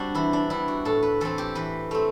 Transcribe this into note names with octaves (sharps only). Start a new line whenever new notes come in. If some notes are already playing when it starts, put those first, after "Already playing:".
Already playing: G3 C4 D4 F#4
E3 E4
D4
G3 B3 E4
F#4
A2 A4
B4
E3 A3 C4 A4
G4
E3 B4
A3 C4